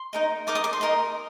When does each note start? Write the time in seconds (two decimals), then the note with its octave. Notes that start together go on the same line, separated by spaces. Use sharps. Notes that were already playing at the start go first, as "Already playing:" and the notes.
Already playing: C6
0.13 D#4 A#4 D#5
0.47 D#4 A#4 D#5 D6
0.55 D#6
0.64 D6
0.73 C6
0.81 D#4 A#4 D#5